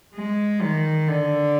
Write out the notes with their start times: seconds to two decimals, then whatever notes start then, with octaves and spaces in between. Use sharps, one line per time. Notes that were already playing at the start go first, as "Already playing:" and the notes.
0.15 G#3
0.62 D#3
1.08 D3